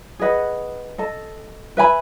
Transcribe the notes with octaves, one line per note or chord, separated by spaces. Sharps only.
G#4 B4 D#5 F#5
A4 D#5 A5
B4 E5 G#5 B5